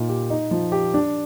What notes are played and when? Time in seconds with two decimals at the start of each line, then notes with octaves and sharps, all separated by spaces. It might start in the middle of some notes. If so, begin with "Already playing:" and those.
Already playing: A#2 D#4
0.09 G4
0.30 D#4
0.51 F3
0.72 G4
0.94 D4